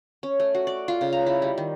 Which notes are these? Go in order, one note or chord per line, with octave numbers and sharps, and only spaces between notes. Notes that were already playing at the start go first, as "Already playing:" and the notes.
C#4
A3
F#4
D5
F4
C#3
A#5
E4
G3
D#3